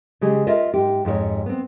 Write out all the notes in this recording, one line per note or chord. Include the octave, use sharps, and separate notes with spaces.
C#3 G#3 G4 G#4
F4 A#4 D#5 E5
G#2 G4
F2 G#2 G4 C#5
B3 C4